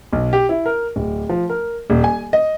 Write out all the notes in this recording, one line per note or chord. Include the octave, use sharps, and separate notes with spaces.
B1
G4
E4
A#4
D1
F3
A#4
D#1
G#5
D#5